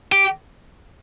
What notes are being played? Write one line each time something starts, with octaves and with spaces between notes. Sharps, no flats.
G4